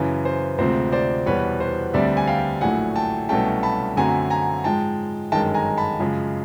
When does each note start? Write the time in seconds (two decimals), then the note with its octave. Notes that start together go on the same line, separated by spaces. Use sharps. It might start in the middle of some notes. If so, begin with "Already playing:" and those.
Already playing: F#2 C#3 E3
0.25 C5
0.58 D2 C3 F3 G#3 C4 C5
0.92 C5 D5
1.26 E2 B2 G3 B4 C#5
1.60 C5
1.94 D2 D3 G3 C4 D5 E5
2.17 G#5
2.27 F5 G5
2.61 A#1 A2 F#3 A3 F#5 G#5
2.96 G5 A5
3.29 C2 B2 F#3 A3 C#4 G5 A5
3.63 A5 B5
3.97 F#2 D3 F#3 A3 C4 G#5 A#5
4.30 G#5 A#5
4.64 G#2 F3 G#3 G5 A5
5.32 G1 F#2 D#3 G#3 G5 A5
5.54 G#5 A#5
5.77 A5 B5
6.00 F#2 C#3 F3 G#3